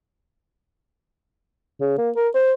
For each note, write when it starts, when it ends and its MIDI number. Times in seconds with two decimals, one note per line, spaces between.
1.80 1.97 49
1.98 2.11 58
2.16 2.28 70
2.34 2.53 72